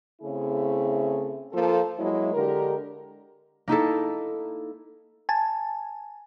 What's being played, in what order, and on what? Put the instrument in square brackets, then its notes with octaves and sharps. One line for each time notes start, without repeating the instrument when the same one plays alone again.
[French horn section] C#3 A3 C4 E4 G#4
F3 A#3 F4 A4
F#3 G#3 A#3 E4
D3 G#3 G4 A#4
[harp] A#3 D#4 E4 A4
[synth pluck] G#5 A5